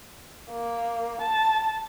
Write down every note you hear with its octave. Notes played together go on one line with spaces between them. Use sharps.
A#3
A5